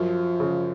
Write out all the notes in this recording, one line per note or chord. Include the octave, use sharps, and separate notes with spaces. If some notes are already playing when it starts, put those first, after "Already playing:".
Already playing: F#2 F3
C#3